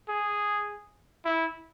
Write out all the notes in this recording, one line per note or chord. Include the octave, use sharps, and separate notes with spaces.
G#4
E4